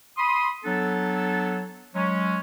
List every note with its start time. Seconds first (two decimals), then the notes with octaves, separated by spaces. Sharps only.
0.18 B5 C6 D#6
0.65 F#3 B3 D4 A4
1.95 F#3 G#3 C#4